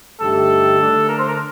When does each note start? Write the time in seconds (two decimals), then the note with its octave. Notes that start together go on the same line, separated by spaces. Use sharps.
0.20 G2 D3 A3 D#4 G4 A4
0.79 D3 A3 D4
1.08 A#4
1.18 C5
1.28 A#4